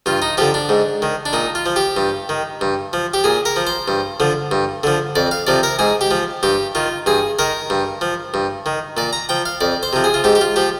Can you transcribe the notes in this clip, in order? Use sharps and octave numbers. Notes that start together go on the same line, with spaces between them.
G2 F4
D#4
D3 F3 G4
D4
G#2
D#3
D4
A#2 D#4
F4
F3
G4
G2
D#3
G2
F3
G4
A#2 G#4
A#4
F3
C5
G2
D3 F3
G2
D3 F3
F2 D5
F5
C3 F3 D5
A#4
G#2 G#4
G4
F3
G2 G4
D#3 F4
G2 G#4
D#3 A#4
G2
F3
G2
D#3
A#2 D5
A#5
F3 G5
F5
F2 D5
C5
C3 F3
G#4
F4
G#2 G4
G4
F4
F3 G4